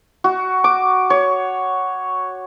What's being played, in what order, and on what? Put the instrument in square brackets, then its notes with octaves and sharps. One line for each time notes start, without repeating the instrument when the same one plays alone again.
[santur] F#4
D6
C#5